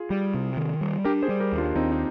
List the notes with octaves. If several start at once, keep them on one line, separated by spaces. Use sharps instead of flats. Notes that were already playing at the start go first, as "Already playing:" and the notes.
Already playing: F4 G#4
G3
C3
D#3
G3
D4 G4 A#4
G#4 C5
G3
G4 A#4
D#2
D4 F4
D#2 C4 D#4
D#4